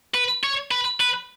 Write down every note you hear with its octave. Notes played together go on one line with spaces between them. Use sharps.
B4
C#5
B4
B4